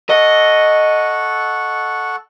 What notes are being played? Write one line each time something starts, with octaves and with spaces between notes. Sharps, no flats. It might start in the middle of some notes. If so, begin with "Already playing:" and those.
A4 D#5 F#5 C#6